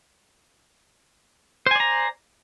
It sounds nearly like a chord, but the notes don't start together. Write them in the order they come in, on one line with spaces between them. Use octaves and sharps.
C5 G#5 D5 A#5